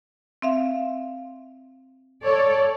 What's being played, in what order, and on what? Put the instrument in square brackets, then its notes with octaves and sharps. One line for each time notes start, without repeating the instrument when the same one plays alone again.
[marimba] C4 E5 F5
[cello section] A4 C#5 D5